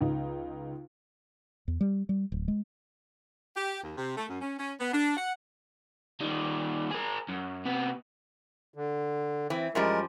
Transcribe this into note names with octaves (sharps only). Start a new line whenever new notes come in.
C#2 D#4
E2
G3
G3
D1
G#3
G4
D#2
C3
A3
F#2
C#4
C#4
B3
D4
F#5
D#3 G3
G#4 A#4
F#2
C3 B3
D3
E3 C4
F#2 F3 G3 G#3 A#4